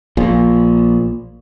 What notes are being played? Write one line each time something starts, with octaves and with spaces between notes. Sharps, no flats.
A#1 A#2